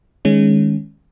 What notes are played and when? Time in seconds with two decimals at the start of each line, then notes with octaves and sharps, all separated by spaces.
0.25 D#3 G#3 C#4